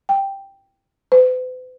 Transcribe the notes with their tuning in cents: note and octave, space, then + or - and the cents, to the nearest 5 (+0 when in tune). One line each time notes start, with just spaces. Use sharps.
G5 +0
B4 +45